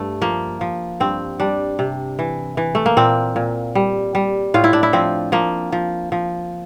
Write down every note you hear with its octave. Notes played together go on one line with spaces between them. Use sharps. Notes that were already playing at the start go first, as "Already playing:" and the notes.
Already playing: G2 A3
F3 A#3
F3
G2 C4
G3 D4
C3
E3
E3
A3
A#3
A#2 C4
A#2
G3
G3
A2 F4
E4
D4
E4
F3 C4
F3 A#3
F3
F3